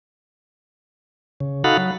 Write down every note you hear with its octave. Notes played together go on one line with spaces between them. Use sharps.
C#3
D#4 F#4 A4 F5 F#5 B5
F#3